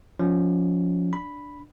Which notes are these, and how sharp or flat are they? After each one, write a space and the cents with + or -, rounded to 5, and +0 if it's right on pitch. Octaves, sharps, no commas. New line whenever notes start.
F3 +20 C#4 +25
D4 +0 B5 +0